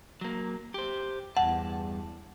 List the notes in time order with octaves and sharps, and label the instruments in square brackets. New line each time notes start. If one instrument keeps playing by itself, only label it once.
[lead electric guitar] F#3 A#3
G4 C5
[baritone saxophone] E2 [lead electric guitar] G2 A5 [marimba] F#5